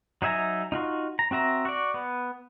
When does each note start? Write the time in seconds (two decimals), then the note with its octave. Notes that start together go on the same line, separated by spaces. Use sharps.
0.22 F#3 D#4 E5 G#5 A#5
0.72 D#4 F4 F#4
1.19 A#5
1.31 C4 F#4 E5 A#5
1.65 F#4 D5
1.94 B3